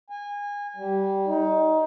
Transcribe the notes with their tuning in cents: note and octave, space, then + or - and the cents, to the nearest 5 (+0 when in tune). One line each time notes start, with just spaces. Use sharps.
G#5 -25
G3 -10
D#4 +20